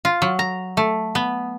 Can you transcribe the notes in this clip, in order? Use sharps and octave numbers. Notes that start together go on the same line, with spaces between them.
F4
F#3
A#5
A3
B3